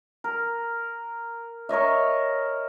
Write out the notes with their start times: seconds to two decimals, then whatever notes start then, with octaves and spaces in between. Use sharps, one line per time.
0.24 A#4
1.69 A#4 C#5 D#5 E5